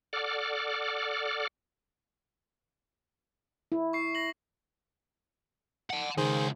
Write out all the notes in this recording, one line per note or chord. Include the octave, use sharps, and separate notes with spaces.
A4 D5 F#5 D6 F6
E4
C#6 C7
A#6 F#7
F#5 A5
C#2 D#3 G#4 C5